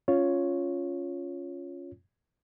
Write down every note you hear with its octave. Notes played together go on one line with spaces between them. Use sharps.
C#4 F4 C#5